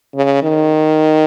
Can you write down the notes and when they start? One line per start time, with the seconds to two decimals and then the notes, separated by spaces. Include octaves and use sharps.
0.15 C#3
0.43 D#3